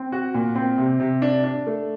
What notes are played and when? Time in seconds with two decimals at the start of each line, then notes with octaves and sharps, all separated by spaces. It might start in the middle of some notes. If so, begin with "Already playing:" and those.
Already playing: C4
0.12 F#4
0.34 A#2
0.55 C4
0.78 C3
1.00 C3
1.22 D4
1.44 D4
1.67 A3